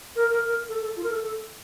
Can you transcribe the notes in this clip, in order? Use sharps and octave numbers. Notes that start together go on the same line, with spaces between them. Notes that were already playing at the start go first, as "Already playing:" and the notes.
A#4
A#4
A#4
A4
A4
F4
A#4
A4
A4